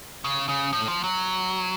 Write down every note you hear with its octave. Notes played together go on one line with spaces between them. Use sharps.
C#3
C#3
A2
F3
F#3